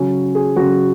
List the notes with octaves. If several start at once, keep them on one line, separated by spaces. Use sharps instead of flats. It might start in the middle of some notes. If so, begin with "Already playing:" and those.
Already playing: C#3 F#3 C#4
G#4
C#3 F#3 F#4